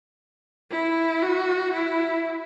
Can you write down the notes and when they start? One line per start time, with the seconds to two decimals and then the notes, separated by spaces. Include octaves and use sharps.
0.71 E4
1.22 F#4
1.73 E4